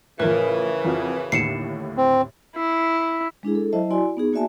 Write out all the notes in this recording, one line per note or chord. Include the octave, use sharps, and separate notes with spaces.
A2 C#3 E3 F3 A#4 B4
F2 F4 F#4
D#2 A2 D3 C7 C#7 E7
C4
E4
G#3 D4 E4 G#4
A4
F#3 E4 C5 D#5 E5 A5
E4 F#4 D5 G#5 C6
B3 D#4 G#4
A#3 F#4 D5 E5 G#5 A5